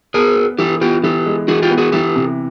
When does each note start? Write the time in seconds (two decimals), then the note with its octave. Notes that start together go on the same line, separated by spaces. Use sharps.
0.14 B3 G#4 A#4
0.36 B3
0.58 E3 G4 A4
0.81 B3 F4 G4
1.03 E3 G4 A4
1.26 G#3
1.48 E3 F#4 G#4
1.62 F4 G4
1.70 B3
1.78 F#4 G#4
1.92 E3 G4 A4
2.16 C3